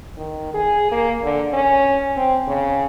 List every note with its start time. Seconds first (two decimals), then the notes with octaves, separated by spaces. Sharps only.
0.17 D#3
0.54 G#4
0.92 A#3
1.23 D3
1.53 C#4
2.17 C4
2.48 C#3